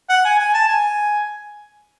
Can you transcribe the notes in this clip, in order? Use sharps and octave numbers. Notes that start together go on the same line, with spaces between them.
F#5
G#5
G#5
A5
G#5